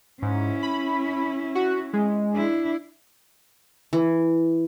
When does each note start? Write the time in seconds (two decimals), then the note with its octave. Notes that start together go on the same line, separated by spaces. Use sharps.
0.22 G#2 C#4 E4
0.63 B5
1.55 F#4
1.93 G#3
2.32 D4 E4
3.93 E3